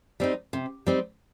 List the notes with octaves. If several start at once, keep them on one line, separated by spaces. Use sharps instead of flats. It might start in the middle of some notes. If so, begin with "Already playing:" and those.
G3 C4 D#4
C3
G3 C4 D#4